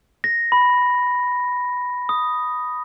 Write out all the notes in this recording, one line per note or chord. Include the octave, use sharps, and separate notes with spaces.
A#6
B5
D#6